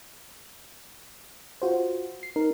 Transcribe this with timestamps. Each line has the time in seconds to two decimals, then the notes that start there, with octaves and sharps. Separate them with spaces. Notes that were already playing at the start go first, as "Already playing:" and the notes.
1.62 F4 F#4 C5
2.23 C7
2.36 D#4 A#4